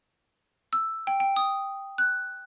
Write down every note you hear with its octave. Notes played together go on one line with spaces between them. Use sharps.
E6
G5
G5
D#6
F#6